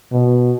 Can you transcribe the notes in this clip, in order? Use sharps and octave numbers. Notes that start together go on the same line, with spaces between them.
B2